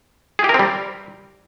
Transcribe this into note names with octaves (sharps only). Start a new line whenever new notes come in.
G#4
G4
A#4
C4
G3